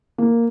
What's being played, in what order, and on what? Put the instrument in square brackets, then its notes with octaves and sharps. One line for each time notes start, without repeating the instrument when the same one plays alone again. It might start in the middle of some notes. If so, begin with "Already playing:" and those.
[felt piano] A#3